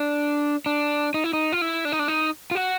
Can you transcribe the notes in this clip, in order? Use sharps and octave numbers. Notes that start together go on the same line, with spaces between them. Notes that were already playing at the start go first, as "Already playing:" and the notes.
Already playing: D4
D4
D#4
E4
D#4
F4
E4
D4
D#4
D4
D#4
F4
F#4